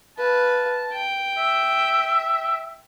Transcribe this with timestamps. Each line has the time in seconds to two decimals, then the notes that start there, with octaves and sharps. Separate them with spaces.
0.18 B4 F5 A5
0.93 G5
1.37 E5